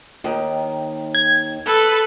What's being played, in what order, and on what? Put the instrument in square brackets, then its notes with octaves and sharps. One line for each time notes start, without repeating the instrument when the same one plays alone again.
[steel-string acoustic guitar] D#2 D#3
[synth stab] G#6
[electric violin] A4 B4